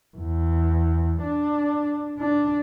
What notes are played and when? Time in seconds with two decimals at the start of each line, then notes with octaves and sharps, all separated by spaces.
0.17 E2
1.22 D4
2.18 D4